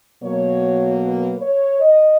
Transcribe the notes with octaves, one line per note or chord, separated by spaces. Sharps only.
B2 F#3 A#3 C#5
B4
C#5
D#5